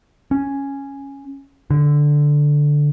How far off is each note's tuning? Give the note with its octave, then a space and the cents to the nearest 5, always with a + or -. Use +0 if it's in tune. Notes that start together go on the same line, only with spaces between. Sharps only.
C#4 -5
D3 +0